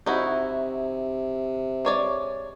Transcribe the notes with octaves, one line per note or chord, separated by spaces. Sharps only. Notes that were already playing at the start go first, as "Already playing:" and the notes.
C3 D#4 E4 F#4
G#3 C#5 D5